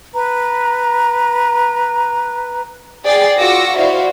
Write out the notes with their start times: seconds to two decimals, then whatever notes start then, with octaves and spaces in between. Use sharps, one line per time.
0.13 B4 A#5
3.04 G#4 D5 G5 A6 C7
3.38 F4 F#4 D6 E6 A#6 C#7
3.77 E4 F#4 C5 D5 E5 F5